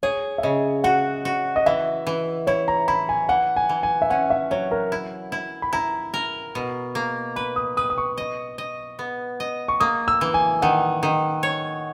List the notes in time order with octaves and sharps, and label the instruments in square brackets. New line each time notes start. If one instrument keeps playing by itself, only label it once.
[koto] G#4 [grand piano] C#5
[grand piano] E5
[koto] C#3 [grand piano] D#5
[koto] F#4 [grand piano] F#5
[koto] F#4
[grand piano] D#5
[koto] E3 [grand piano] E5
[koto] E3
[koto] E4 [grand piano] C#5
[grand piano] A#5
[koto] E4 [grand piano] B5
[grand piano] G#5
[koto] E3 [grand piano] F#5
[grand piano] G#5
[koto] E3
[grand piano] G#5
E5
[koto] C#4 [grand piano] F#5
[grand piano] E5
[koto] F#3 [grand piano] C#5
[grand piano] A#4
[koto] E4
E4
[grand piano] B5
[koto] E4 [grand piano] A#5
[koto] A#4
B2
A#3
[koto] B4 [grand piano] B5
[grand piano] D#6
[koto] B4 [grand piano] D#6
[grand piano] D#6
C#6
[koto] D#5
D#5
B3
D#5
[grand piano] C#6
[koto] A#3 [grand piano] D#6
[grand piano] E6
[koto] E3
[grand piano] G#5
[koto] D#3 [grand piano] F#5
[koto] D#3
C#5